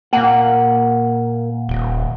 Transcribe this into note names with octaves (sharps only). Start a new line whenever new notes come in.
A#2 A#3 F#5
D#1